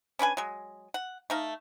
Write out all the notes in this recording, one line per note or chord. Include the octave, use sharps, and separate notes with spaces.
C#4 D4 B4 G#5
F#3 G#3
F#5
A3 D#4 F5